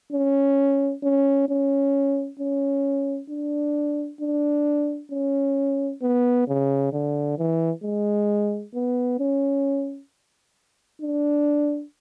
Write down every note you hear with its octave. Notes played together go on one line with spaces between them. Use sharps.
C#4
C#4
C#4
C#4
D4
D4
C#4
B3
C#3
D3
E3
G#3
B3
C#4
D4